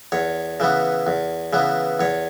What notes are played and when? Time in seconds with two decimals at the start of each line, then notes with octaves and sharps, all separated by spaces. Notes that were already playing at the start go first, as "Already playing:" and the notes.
0.12 E2 C#5
0.60 C#3 E3 B3
1.07 E2
1.53 C#3 E3 B3
2.00 E2 C#5